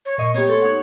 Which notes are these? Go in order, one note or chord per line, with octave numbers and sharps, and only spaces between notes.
C#5
A#2 D#5 C#6
A#3 B3 G4 C#5
A3 A4 C6
D#4 F#5